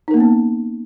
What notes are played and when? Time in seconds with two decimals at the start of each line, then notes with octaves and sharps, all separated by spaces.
0.08 D#4
0.11 A#4
0.14 A#3
0.17 B3
0.20 C#4